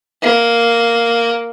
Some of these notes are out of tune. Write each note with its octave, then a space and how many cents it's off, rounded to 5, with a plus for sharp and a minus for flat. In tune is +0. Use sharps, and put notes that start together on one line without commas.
A#3 +0